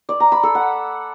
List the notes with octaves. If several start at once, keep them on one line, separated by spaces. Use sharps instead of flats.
D5
A#5
B5
A4
F#5